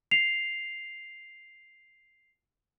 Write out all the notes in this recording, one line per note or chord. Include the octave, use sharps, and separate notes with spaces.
C7 F7